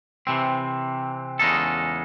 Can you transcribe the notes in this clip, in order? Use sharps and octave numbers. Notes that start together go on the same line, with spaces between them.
C3 E3 C4
E2 C#3 G#3 D#4 A4